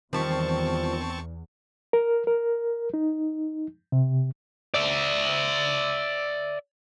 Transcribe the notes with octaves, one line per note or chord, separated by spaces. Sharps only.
E2 D#3 F3 G3 C4 A5 C#6
A#4
A#4
D#4
C3
D5 E5